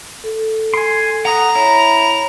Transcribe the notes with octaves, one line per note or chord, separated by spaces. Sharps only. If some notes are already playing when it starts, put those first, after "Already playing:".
A4
G#5 C6
F#5 A#5 D#6
E4 C#5